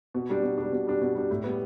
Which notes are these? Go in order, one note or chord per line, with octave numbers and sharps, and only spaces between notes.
B2
G3 D4
B2
G3 D4
B2
G3 D4
B2
G3 D4
A2
G3 B3